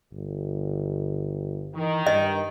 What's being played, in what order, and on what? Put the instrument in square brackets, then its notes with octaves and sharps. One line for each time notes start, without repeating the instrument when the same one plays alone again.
[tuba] G1
[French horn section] D#3 [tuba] E3
[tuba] G2 [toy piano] D#5